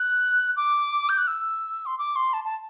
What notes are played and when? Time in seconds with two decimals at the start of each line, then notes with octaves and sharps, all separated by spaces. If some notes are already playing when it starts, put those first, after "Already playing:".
Already playing: F#6
0.57 D6
1.09 G6
1.18 F#6
1.27 E6
1.86 C6
1.98 D6
2.16 C6
2.33 A5
2.44 A5